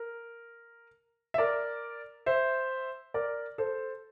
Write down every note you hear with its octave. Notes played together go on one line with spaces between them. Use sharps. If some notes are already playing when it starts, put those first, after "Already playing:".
Already playing: A#4
E5
A#4 D5
C5 E5
A#4 D5
A4 C5